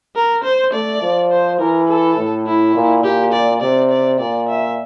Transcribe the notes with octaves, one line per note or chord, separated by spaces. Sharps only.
A#4
C5
A3 D5
F3
C5
E3 A#4
A4
A2
E4
A#2
A#2 G4
D5
C3 D5
D5
A#2 D5
E5